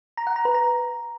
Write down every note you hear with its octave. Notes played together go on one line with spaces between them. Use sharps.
A#5
F#5
A#5
B4
A#5